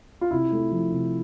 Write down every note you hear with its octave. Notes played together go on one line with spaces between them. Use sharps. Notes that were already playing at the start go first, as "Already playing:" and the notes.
F4
C3 E4
A3
F3
C3